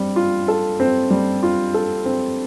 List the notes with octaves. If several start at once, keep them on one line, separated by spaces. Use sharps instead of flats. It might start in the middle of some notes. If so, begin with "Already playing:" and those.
Already playing: G3 C4
F4
A4
C4
G3
F4
A4
C4